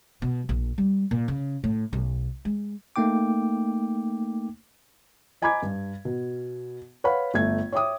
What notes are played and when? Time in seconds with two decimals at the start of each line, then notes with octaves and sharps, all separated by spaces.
0.22 B2
0.49 A#1
0.78 G3
1.11 A#2
1.28 C#3
1.64 A2
1.93 B1
2.45 G#3
2.96 A3 A#3 D#4 G5 D6
5.42 D#5 G#5 A#5 B5 D6 G#6
5.62 G2
6.05 B2
7.04 B4 C#5 F5 F#5 B5
7.34 G1 A3 G#6
7.72 C#5 E5 G5 D6 D#6